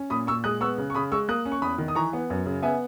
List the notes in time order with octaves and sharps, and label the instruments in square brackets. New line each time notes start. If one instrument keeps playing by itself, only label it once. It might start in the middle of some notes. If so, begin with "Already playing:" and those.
Already playing: [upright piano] C#4
A#2 B5 D#6
A#2 C#6 E6
G#3 D#6 F#6
B3 C#6 E6
C#3
C#6
C#3 B5 D#6
G#3 C#6 E6
A#3 D#6 F#6
C#4
C#6
E2 B5 D#6
D#3
D#6
E3 A#5 C#6
B3
F#2
C#3
B3 E5 G#5